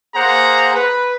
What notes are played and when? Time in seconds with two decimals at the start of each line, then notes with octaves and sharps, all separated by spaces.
0.15 A#3 G#4 C5 F#5 A#5
0.75 B4